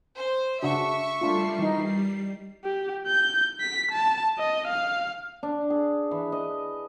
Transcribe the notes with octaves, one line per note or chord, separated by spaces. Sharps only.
C5
C#3 D4 F#4 E5 C#6
G3 A3 D4 F4 C7
E3 D#4
G4
G6
B6
A5
D#5
F5
D4
G#4
E3
D#5